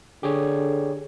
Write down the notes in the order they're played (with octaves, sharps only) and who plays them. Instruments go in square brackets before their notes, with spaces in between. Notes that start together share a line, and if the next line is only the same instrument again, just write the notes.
[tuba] D3 [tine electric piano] G4 G#4 C#5